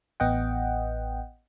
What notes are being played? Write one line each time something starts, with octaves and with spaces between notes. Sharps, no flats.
A1 B3 D#5 F#5 G5